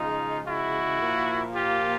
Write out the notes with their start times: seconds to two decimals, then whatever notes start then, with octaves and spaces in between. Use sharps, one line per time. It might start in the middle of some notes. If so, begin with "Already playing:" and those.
Already playing: C#3 F3 G#3 D#4 F4
0.47 E4 F#4
1.01 A#2 F3 A#3
1.55 F4 G4